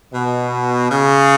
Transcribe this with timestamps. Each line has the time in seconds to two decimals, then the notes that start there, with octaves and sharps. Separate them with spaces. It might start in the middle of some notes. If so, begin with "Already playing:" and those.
0.13 B2
0.89 C#3